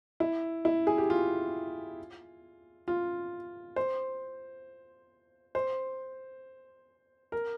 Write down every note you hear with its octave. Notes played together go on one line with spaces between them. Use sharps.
E4
E4
G#4
G4
F4
F4
C5
C5
A#4